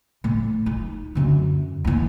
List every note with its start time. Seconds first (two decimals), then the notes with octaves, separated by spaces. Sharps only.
0.24 A2
0.66 D#4
1.15 F#2 D3
1.85 D#2 E3